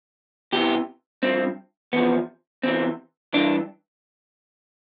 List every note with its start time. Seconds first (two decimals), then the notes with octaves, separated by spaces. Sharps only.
0.53 E2 C3 E3 G4
1.23 G2 F3 C4
1.93 E2 C3 F3 B3
2.63 E2 C3 E3 C4
3.34 G2 E3 D4